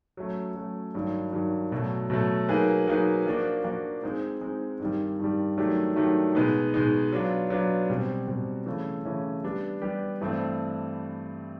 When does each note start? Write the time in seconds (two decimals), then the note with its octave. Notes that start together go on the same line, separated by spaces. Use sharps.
0.17 F#3 A3 C#4
0.56 F#3 A3 C#4
0.94 G2 D#3 F#3
1.33 G2 D#3 F#3
1.72 B2 F#3 A3
2.10 B2 F#3 A3
2.49 F#3 A#3 D#4 G#4 B4
2.87 F#3 A#3 D#4 G#4 B4
3.26 F3 A#3 D4 F#4
3.64 F3 A#3 D4 F#4
4.03 G#3 C4 D#4
4.41 G#3 C4 D#4
4.80 G2 D#3 G3
5.20 G2 D#3 G3
5.57 D#3 F#3 A3 D4 G4
5.96 D#3 F#3 A3 D4 G4
6.35 B2 G#3 B3 D#4
6.74 B2 G#3 B3 D#4
7.12 F#3 B3 D4 F4
7.50 F#3 B3 D4 F4
7.90 B2 G3 C4
8.28 B2 G3 C4
8.66 C#3 E3 A3 C#4
9.05 C#3 E3 A3 C#4
9.44 G3 B3 D4 G4
9.81 G3 B3 D4 G4
10.21 G2 E3 A3 C4